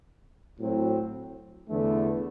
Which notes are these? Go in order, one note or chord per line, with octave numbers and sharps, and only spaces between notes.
A2 F#3 C4
E2 D3 A3